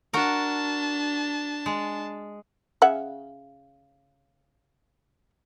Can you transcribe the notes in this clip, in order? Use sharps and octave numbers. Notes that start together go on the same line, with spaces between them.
D4 F#4 A#4 A5
G#3
C#3 E5 F#5